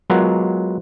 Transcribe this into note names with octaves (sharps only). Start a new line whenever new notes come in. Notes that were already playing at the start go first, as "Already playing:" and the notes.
F#3 G#3 B3 F4 A#4 F#5